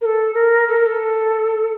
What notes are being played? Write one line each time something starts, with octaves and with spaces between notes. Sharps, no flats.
A#4
A4
A#4
A4
A#4
A4